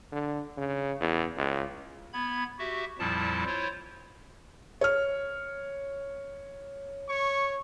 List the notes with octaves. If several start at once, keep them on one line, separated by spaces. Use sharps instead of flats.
D3
C#3
E2
C#2
B3 B5 G#6
F#4 G4 E5
F2 A#2 F3 G3 E4 A5
E4 F4 C5 C#5
C#5 F6
C#5 C#6